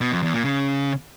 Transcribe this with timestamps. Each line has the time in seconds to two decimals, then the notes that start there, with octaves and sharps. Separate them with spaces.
0.01 B2
0.12 F2
0.23 E2
0.34 A#2
0.45 C#3